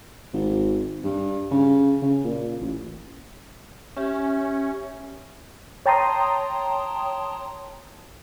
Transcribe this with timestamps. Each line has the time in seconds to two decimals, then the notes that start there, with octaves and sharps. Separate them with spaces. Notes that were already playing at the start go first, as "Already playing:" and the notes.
0.33 G#1
1.04 G2
1.51 C#3
2.02 C#3
2.24 A#2
2.60 A1
3.96 C#4 G4 E5
5.86 C#5 G5 A5 A#5 C6 D#6